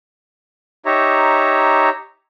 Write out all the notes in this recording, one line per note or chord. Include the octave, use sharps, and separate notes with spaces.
D#4 G4 C#5 E5 A#5